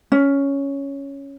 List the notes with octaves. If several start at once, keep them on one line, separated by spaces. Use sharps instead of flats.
C#4